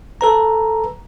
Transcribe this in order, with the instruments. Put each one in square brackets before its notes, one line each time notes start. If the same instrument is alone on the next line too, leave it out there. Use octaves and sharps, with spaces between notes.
[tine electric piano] A4 B4 A#5